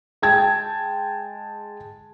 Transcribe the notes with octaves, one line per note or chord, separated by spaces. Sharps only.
G#3 G5 A5 G#6